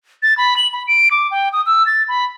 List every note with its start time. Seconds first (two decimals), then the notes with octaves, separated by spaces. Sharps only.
0.23 A6
0.37 B5
0.57 F#7
0.73 B5
0.88 D7
1.11 D6
1.31 G5
1.53 D#6
1.66 E6
1.86 A6
2.08 B5